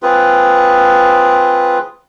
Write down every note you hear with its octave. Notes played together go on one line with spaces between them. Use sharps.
C4 F4 G#4 B4